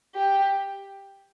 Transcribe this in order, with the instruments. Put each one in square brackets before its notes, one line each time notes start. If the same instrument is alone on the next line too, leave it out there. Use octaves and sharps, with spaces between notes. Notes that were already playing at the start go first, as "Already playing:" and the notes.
[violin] G4